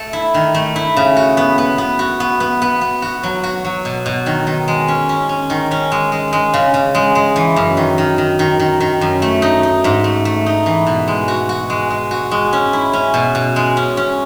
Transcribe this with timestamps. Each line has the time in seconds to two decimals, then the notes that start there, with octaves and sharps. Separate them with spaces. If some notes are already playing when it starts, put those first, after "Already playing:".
Already playing: A3 A4
0.13 E4
0.34 D#3
0.54 A3
0.76 E4
0.97 C#3
1.17 F#4
1.37 B3
1.58 B3
1.78 B3
1.99 F#4
2.20 B3
2.40 B3
2.62 B3
2.81 B3
3.02 F#4
3.23 F#3
3.44 F#4
3.65 F#3
3.85 B2
4.06 B2
4.26 D#3
4.47 D#3
4.68 G#3
4.88 C#4
5.09 C#4
5.29 C#4
5.50 D#3
5.71 C#4
5.92 G#3
6.12 G#3
6.33 G#3
6.54 C#3
6.74 C#3
6.95 G#3
7.15 G#3
7.36 E3
7.56 F#2
7.77 D#3
7.98 D#3
8.18 D#3
8.39 D#3
8.60 D#3
8.80 D#3
9.01 F#2
9.22 A3
9.42 D#4
9.63 D#4
9.84 G#2
10.04 A3
10.25 A3
10.46 D#4
10.66 E3
10.87 B2
11.08 G#3
11.28 F#4
11.49 F#4
11.70 G#3
11.90 G#3
12.11 F#4
12.31 G#3
12.53 C#4
12.73 E4
12.93 C#4
13.14 B2
13.35 B2
13.56 G#3
13.77 C#4
13.97 C#4